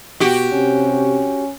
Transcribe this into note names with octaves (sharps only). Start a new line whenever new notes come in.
B2 F#4 G4
C3 C#4